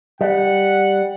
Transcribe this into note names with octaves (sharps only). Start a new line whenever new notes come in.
G3 F#5